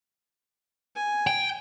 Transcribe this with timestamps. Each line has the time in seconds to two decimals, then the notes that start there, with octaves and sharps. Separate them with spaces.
0.96 G#5
1.27 G5